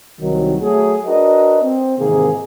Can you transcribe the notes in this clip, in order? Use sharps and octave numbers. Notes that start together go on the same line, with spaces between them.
C2 D#3 F#3
F#3 A3 G#4
D4 F#4 A#4 B4 D#5
C4
G#2 C3 D#3 E3 A#3 G#4